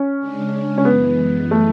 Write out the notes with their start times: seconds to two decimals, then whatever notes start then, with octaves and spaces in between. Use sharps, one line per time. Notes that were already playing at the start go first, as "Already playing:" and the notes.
Already playing: C#4
0.19 C#3 G#3 D4
0.78 C#4
0.85 F#2 E3 G#3 B3
1.51 A3